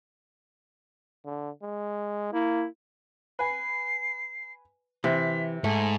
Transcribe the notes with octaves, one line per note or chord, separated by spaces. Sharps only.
D3
G#3
A#3 E4
B4 G#5 C7
C3 E3 B6
G#2 A3 G#5